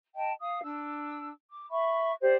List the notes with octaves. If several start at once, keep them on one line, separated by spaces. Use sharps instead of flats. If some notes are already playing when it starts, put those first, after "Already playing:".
D#5 G5 A5
F5 D#6
D4 E6
D6
E5 B5 C#6
G4 C5 D5